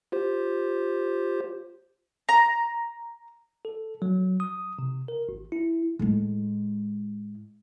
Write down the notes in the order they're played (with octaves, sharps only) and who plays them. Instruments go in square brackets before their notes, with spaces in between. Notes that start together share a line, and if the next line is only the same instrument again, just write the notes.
[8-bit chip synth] F4 G4 C5
[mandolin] A#5
[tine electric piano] A4
F#3
D#6
C3
A#4
G#1
E4
[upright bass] A2 G#3